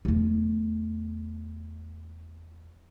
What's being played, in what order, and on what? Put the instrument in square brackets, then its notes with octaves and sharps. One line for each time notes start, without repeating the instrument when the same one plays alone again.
[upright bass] E2 A3